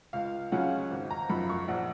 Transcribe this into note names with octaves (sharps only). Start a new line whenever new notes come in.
C#2 F5
C#3 F#3 C#4 F4 F#5
G#1
A#5
F#2 F3 B5
C#6
A#1 F#5